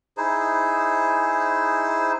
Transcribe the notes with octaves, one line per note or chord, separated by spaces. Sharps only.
D#4 E4 G#4 C5